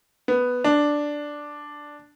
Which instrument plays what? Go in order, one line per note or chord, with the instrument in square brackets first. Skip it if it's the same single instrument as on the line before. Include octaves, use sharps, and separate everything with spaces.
[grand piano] B3
D4